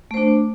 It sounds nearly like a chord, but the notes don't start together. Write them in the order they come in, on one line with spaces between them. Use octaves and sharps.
A3 C5 D4